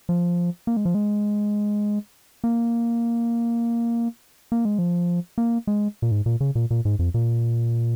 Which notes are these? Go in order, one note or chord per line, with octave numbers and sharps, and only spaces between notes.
F3
A#3
G#3
F3
G#3
A#3
A#3
G#3
F3
A#3
G#3
A#2
G#2
A#2
C#3
A#2
A#2
G#2
F2
A#2